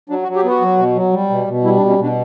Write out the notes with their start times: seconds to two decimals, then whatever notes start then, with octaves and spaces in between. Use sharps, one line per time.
0.10 F#3 D4
0.23 F#4
0.28 F#3
0.36 G4
0.44 B3 F#4
0.61 F#3
0.78 B2
0.96 F#3
1.13 G3
1.30 B2
1.47 B2
1.64 G3 E4
1.77 D4
1.81 B2
1.90 C#4
1.99 B2 D4